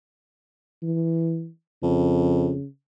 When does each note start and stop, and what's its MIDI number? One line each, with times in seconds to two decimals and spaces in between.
0.83 1.48 52
1.82 2.54 41
1.82 2.65 49